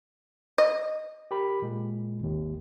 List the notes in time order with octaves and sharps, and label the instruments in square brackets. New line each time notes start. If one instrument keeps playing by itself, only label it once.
[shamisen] D#5
[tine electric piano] G4 A#4 B5
A#2 G#3
G#1 D#2